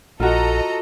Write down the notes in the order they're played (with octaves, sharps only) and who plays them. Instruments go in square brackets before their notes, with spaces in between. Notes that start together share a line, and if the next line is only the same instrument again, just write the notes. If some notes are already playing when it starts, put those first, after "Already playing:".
[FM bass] A#1 [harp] F4 F#4 [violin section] A4 D#5 A#5